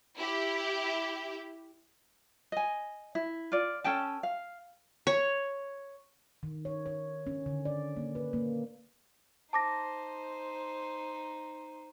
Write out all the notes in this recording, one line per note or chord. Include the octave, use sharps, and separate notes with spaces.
E4 G4
D#5 G#5
E4
F4 D5
C#4 A4 G5 A5
F5
C#5
D#3
C#5
C#5
C#4
D3
D5
A#3
B4
A#3
D#4 C5 A5 D6 A#6